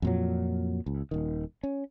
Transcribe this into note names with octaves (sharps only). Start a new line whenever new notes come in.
F2 A#2 F#3
C#2
D#1 D#3
C#4